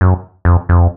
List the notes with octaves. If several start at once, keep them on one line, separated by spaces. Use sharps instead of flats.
F#2
F2
F2